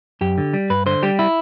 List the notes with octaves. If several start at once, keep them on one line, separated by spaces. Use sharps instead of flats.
F#2 G4
D3
G3
G2 B4
D3 C5
G3 G4
E4